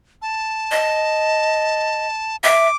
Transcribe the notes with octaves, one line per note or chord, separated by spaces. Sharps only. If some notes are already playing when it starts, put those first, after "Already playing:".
A5
D#5
E5 D6